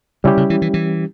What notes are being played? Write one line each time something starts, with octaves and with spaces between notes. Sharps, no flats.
C#3 G3 C#4 E4 G4
C#3
E3
E3
E3